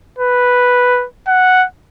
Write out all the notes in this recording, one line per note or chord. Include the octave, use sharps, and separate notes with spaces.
B4
F#5